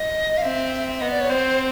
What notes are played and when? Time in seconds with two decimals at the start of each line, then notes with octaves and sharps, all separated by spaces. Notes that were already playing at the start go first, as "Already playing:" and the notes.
Already playing: D#5
0.38 F5
0.42 C4 E5
1.00 B3 D#5
1.11 D5
1.21 C#5
1.30 C4 C5